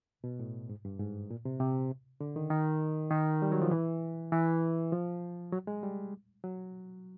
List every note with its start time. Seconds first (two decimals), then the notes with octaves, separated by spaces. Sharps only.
0.24 B2
0.40 A2
0.69 G#2
0.85 G2
1.00 G#2
1.31 A#2
1.45 C3
1.60 C3
2.21 D3
2.36 D#3
2.50 D#3
3.11 D#3
3.42 G3
3.52 F#3
3.62 F3
3.71 E3
4.32 E3
4.92 F3
5.53 F#3
5.67 G#3
5.83 G3
6.44 F#3